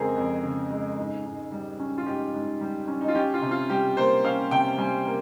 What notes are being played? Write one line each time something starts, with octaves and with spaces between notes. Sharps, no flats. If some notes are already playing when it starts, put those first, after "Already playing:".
Already playing: F2 C#3 G#3 C4 G#4 A#4
F2
C#3
G#3
G#2
G#2
G3
C#4
F4
G#2 G4
G#2
G3
C#4
D#4
F4
C#4 G4
F4
C3
F4
G3 G4
A#3 C5
C#4 F5
C3 G5
G3 G#5
A#3